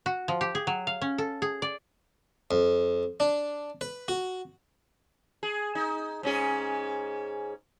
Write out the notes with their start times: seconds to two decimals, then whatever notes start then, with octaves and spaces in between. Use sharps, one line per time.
0.06 F#4
0.28 F3
0.41 G4
0.55 G#4
0.67 F#3
0.87 F5
1.02 C#4
1.18 A4
1.42 G#4
1.62 D5
2.51 F2
3.20 D4
3.81 B4
4.08 F#4
5.43 G#4
5.75 D#4
6.23 G#2 C#4 G#4